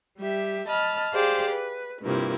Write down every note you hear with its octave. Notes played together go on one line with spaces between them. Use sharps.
G3 G4 E5
D#5 A5 B5 F6
G4 G#4 C5 D5 F5
B4
G2 C3 F3 A#3 E4